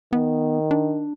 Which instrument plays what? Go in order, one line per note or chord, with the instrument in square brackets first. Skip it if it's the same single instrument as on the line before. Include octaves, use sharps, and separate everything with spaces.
[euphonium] D#3 [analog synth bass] B3
[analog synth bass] D4